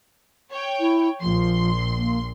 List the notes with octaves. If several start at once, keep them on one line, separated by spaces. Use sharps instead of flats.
C#5 G5
E4
A#1 F3 C6
A#3